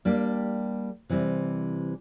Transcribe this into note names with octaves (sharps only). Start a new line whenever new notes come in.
G3 A#3 D4 G4
C3 E3 G3 C4